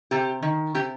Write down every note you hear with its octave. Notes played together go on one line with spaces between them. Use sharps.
C3 G4
D#3
C3 G4